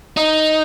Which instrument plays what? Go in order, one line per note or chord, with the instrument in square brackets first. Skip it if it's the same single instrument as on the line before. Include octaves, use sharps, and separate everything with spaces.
[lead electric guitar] D#4